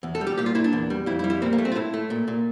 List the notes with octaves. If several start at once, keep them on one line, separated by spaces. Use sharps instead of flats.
E2
A4
G3
G4
A#2 G4
F4
A#2 E4
D4
E2
G3
F2 E4
E4
G3
E4
A#2 C4
A#3
A3
C4
F4
A2 E4
A3
A#2
A#2